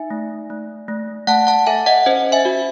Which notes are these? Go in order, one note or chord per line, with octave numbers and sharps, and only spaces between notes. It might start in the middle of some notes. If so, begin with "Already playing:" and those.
Already playing: D#4 E5 G#5
A3
A3
A3
A3 F#5 A5
F#5 A5
A4 E5 G#5
D#5 F#5
C#4 C5 D#5
E5 G#5
F#4